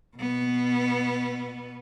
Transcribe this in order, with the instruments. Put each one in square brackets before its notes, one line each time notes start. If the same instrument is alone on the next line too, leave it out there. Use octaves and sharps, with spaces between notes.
[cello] B2 B3